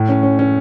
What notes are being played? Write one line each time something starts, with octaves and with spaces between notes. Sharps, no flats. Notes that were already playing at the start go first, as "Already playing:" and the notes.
Already playing: A2
C#4
C#4
C#4